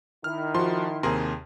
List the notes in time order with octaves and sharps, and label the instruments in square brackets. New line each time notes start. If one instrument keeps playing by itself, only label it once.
[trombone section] D#3 E4 [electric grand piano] F6
[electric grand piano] F3 F#4 [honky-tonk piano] C6
[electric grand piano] D#2 C3 [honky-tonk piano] G#4 A#4 C6